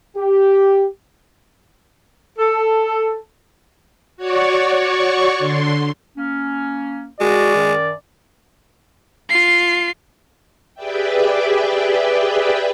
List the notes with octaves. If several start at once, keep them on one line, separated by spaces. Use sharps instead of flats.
G4
A4
F#4 C#5 D5 C#6
D3 C6
A#3 C#4
G#3 F#4 D5
F#2 D#3
F4 C7
G4 G#4 B4 D5 E5 G5